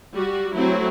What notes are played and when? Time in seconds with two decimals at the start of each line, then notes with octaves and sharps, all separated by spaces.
0.14 G3 F#4
0.56 F#3 A3 C4 E4